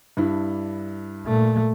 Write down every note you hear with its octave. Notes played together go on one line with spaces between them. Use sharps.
G2 D4 E4
A#2 A3